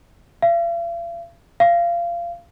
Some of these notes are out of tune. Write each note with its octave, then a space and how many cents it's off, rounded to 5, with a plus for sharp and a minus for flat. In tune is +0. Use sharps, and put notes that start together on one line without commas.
F5 -45
F5 -25